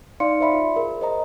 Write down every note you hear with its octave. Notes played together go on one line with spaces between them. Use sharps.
D#4 D5 F5 C6 C#7
C5 D5 E5 B5 C6
F4
G#4 A#4
C5 D#5 A#5